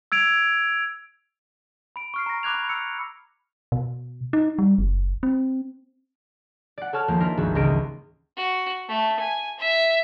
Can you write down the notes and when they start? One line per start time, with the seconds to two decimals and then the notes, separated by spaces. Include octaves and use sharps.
0.12 E6 G#6 D7 F7
1.96 B5 D7
2.14 C#6 F6 C7
2.26 A#5 A#6
2.43 B5 D6 F#6 G#6 F7
2.54 B5
2.69 E6 C#7
3.72 B2
4.33 D#4
4.59 G3
4.78 F#1
5.23 C4
6.78 D5 F#5
6.93 A4 C#5 A5 F6
7.08 D#2 F3 G#3 A#3
7.20 D4 E4 F4 A#4
7.37 G#1 D2 G3 F#4 A4
7.55 C#2 E3 D#5 A#6 D7
8.37 F#4
8.88 A3
9.20 G#5
9.59 E5